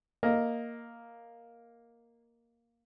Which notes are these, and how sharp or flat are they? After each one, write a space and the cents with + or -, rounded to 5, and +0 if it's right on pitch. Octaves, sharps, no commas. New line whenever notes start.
A#3 +0 D#5 +0